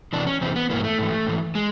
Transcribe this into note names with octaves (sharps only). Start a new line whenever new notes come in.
E2 C3 E3 D4
C#4
E2 C3 E3 C4
B3
G#2 E3 A#3
A3
G#2 E3
G#2 E3
G#3